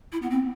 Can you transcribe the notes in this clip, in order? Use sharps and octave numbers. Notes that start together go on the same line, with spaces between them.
E4
B3
C4